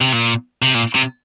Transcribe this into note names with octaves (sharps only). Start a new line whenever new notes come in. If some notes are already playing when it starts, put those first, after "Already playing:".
C3
A#2
C3
A#2
C3